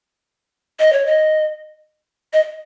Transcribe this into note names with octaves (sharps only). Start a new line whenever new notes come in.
D#5
C#5
D#5
D#5